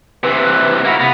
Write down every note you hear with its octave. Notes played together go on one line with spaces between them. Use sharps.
C3 E3 B4
A#3 E4 F#4 F#5 A#5
C3 B3 B5